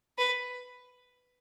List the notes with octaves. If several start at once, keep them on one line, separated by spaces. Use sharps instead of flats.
B4